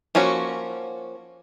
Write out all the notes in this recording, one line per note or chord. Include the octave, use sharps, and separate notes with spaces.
F3 A#3 C#4 F#4